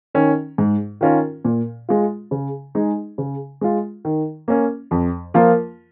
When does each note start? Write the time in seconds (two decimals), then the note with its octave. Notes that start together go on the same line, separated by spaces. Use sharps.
0.15 D#3 C#4
0.58 G#2
1.01 D#3 C#4 F4 A#4
1.45 A#2
1.89 G#3 F4
2.31 C#3
2.75 G#3 D#4 G#4
3.18 C#3
3.61 G#3 F4
4.05 D#3
4.48 A#3 C#4
4.91 F2
5.34 F3 A#3 F4 A#4